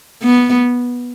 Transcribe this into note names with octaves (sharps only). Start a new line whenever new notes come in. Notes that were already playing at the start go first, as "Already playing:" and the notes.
B3